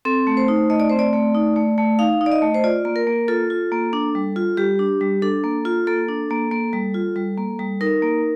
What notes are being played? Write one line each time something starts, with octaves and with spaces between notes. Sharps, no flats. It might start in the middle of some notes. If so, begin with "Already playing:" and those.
C4 A4
A3
C5
D#4
A3 D#5
D5
C4 C5
D5
A3
D#4
A3
A3
D#4 F5
D#4
D5
D#5
A3
C5
F4 D5
A#3
A#4
A#3
F4 A4
F4
A#3
D4
G3
F4
G3 G4
D4
G3
D4 A4
A#3
F4
A#3 A4
D4
A#3
A#3
G3
F4
G3
A#3
G3
D#4 A#4
A#3